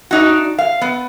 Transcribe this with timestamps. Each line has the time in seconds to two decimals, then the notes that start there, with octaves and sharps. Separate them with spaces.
0.11 D4 D#4 F#4
0.59 F5
0.81 B3